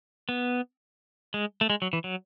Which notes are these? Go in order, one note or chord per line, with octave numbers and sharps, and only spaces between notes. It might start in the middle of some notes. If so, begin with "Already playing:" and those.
B3
G#3
A3
G#3
F#3
E3
F#3